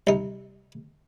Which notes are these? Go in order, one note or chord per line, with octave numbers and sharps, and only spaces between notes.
C2 D#4